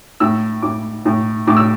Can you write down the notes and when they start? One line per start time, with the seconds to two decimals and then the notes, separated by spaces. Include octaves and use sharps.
0.20 A2 E6
0.62 A2 D6
1.05 A2
1.47 A2 D6
1.57 E6